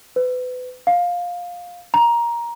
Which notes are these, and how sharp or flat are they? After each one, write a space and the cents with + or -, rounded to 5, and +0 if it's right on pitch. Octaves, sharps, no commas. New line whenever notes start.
B4 +30
F5 +15
A#5 +15